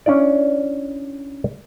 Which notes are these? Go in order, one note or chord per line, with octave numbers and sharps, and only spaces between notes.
C#4 D4 E4 D5